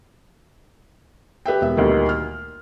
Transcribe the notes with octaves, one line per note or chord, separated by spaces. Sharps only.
G4 B4 E5 G5
E1 E5
D2 A#2 D#3 G3
F6